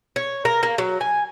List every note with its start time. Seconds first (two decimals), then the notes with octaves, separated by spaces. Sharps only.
0.16 C#5
0.45 A#4
0.63 A#3
0.78 F#3
1.01 G#5